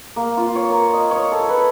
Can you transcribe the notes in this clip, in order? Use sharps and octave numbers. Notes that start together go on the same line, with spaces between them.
A#3
F4
C#5
A#4
D#5
C#5
A4
B4